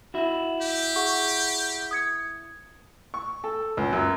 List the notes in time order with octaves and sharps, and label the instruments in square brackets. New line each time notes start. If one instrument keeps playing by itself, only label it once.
[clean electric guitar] E4 F#4
[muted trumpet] G4
[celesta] G#4 F#5 C#6
D#6 G#6 C#7
[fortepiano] C#6
A4
C#2
F#2